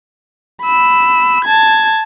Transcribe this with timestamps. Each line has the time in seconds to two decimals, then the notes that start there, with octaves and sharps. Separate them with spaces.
0.62 B5 E6
1.45 A5 G#6